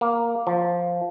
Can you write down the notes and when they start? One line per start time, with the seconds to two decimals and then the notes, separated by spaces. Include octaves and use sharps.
0.01 A#3
0.47 F3